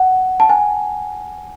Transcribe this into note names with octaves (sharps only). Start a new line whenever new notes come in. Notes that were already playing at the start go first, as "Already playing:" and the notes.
Already playing: F#5
A5
G#5